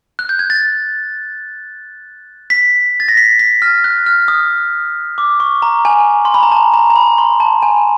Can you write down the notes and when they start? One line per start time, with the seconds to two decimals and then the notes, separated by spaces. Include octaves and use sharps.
0.19 F#6
0.29 G6
0.39 G#6
0.50 A6
2.50 B6
3.00 A6
3.08 A#6
3.17 B6
3.39 B6
3.62 F6
3.84 F#6
4.06 F6
4.28 D#6
5.18 D6
5.40 C#6
5.62 A#5
5.85 G#5
6.25 C6
6.34 B5
6.43 A#5
6.52 A5
6.74 A#5
6.90 A#5
6.96 B5
7.18 C6
7.40 A5
7.62 G#5